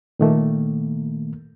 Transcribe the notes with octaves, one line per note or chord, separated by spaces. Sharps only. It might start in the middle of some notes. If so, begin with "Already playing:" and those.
A#2 D#3 A3 A#3